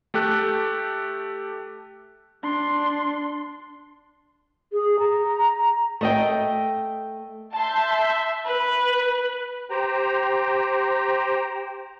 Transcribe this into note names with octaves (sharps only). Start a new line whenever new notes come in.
A3 G4 A4 F#6
D4 C6
G#4
A#5
A3 D#5 G5
E5 A5 C6 G6
B4
G4 C5 G5 A#5